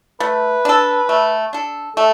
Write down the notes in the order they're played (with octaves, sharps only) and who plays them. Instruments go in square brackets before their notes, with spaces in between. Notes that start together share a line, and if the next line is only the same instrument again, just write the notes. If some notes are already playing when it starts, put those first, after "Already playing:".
[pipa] A3 [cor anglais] B4
[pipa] D4 A4
A3
D4 A4
[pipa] A3 [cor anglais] A4